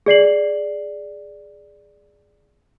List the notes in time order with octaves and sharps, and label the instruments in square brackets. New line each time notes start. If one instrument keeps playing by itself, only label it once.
[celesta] G#4 D5 C7 F#7